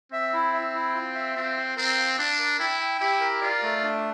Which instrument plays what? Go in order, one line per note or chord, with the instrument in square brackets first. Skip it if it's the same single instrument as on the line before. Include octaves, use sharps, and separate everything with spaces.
[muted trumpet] C4 [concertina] E5
[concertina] E4
E5
E4
F4
E5
[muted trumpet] C4 [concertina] F4
[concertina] F4
[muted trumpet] C4 [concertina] A#4
[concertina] F5
[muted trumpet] D4 [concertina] F5
[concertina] A#4
[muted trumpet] E4 [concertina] G5
[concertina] G5
[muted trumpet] E4 [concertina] G4
[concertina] A#4
[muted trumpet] F4 [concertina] D5
[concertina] A3
D4